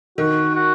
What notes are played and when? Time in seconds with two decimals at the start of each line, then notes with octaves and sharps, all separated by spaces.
0.18 D#3 F#4
0.55 F#4